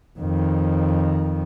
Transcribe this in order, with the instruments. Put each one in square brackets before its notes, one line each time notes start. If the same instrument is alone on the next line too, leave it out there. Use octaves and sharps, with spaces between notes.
[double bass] F2 D#3